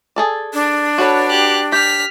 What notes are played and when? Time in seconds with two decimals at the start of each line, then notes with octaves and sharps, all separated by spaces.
0.16 G#4 A4 D5
0.54 D4
0.98 F#4 A4 B4 C#5
1.29 G4 F#6
1.72 G4 F6 B6